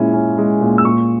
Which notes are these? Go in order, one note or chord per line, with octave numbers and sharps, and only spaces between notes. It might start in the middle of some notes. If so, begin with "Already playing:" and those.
Already playing: A#2 G#3 C#4 E4
C#4
G#3
A#2
E6
A#2 C#6